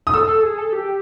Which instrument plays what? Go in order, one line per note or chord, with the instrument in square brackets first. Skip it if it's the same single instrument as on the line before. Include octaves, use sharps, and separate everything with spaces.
[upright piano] D#6
[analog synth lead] A4 [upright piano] E6
[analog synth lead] A4
G#4
A4
G4